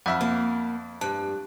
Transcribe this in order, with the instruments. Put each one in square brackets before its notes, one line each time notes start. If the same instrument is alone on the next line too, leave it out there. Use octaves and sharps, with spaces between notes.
[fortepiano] F2 E5 [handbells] F#5 B5 F6
[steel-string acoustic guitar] A#3
[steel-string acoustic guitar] G2 [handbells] A5 F#6